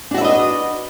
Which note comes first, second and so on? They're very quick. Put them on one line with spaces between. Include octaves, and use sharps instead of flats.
D4 F#4 E5 B4 D#5